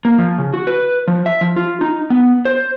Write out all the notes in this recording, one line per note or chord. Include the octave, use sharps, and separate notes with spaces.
A#3
F3
C#3
F#4
B4
F3
E5
F3
F4
D#4
B3
C5